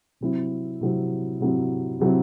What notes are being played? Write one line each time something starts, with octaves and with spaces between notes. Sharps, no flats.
C3 F#3 C4 E4
C3 F#3 C4 E4
C3 F#3 C4 E4
C3 F#3 C4 E4